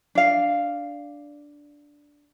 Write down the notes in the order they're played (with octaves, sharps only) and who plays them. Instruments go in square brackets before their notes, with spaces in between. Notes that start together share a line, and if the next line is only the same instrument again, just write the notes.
[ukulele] D4 F5